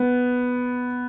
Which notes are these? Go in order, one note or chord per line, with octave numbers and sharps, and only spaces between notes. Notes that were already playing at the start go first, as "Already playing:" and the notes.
Already playing: B3